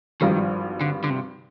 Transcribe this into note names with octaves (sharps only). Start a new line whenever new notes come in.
G#1 G2 D#3 F3
D3
D3
C3